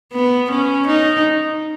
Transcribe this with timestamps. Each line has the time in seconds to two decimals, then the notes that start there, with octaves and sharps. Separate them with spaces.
0.13 B3
0.50 C#4
0.87 D#4